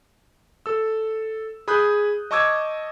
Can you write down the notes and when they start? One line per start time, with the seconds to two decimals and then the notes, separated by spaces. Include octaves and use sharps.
0.66 A4 E6
1.68 G#4 B5 D#6 F#6 G6
2.31 D#5 A5 C#6 D6 E6 G#6